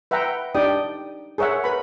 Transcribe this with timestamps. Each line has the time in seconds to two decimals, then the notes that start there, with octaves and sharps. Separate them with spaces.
0.11 B4 E5 F#5 G5 A#5
0.54 D4 D#4 G4 D5 G5 D#6
1.38 G#4 A#4 C#5 E5 F#5
1.64 A#4 B4 B5